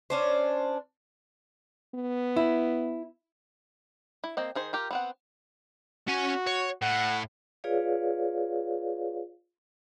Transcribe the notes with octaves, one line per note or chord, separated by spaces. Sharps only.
C#4 D4 C5
B3
E4
E4
A#3 C4 D#5
D#3 G#4 C5
F4 G4 A#4
B3 C4 F#5
C#4 F#4 G#5
C#5
A2 F#5
F4 G#4 B4 C#5 D5 F5